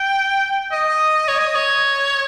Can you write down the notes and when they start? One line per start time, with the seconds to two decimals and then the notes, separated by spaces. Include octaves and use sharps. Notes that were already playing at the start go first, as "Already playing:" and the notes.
Already playing: G5
0.72 D#5
1.28 C#5
1.38 D#5
1.55 C#5